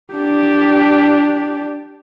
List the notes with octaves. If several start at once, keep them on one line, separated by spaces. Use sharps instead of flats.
D4 G4